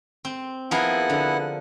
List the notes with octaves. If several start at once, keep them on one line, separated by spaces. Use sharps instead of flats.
C4
F3 B3 E4 G#4 A#4 F#5
D3